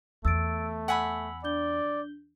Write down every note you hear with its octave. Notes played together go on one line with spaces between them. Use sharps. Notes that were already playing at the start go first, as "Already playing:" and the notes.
E2 A3 E6 A6 D7
F#5 G#5 B5 E6 B6 F#7
D4 D5 G6 G7